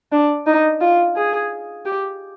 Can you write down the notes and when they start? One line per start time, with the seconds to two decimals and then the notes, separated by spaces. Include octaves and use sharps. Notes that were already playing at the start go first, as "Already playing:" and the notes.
0.12 D4
0.47 D#4
0.81 F4
1.16 G#4
1.86 G4